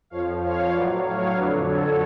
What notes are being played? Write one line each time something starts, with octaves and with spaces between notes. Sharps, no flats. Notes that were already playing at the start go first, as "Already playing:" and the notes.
F2 F3 C#5 F5
C#5 F5
A2 F#3 B4 D5
C#5 F5
F2 D3 F#3 B4 D5
A4 C#5